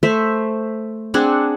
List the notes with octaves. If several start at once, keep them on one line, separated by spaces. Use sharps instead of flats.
A3 C5 E5
C4 D4 G#4 F#5